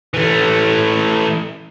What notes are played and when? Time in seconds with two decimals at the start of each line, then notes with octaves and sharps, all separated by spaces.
0.14 E3 A3